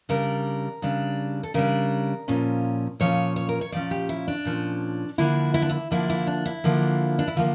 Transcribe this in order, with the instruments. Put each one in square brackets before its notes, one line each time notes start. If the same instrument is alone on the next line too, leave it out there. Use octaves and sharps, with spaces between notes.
[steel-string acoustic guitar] C#3 G3 D4 A#4
C#3 G3 D4
A4
C#3 G3 D4 A#4
A#2 F3 C#4
A#2 F3 C#4 C#5
C#5
A#4
C#5
A#2 F3 C#4 D5
G4
E4
D4
A#2 F3 C#4
D3 F3 A#3 D4 E4
E4
D4
E4
D3 F3 A#3 D4 E4
E4
D4
E4
D3 F3 A#3 D4
D4
E4
D3 F3 A#3 F4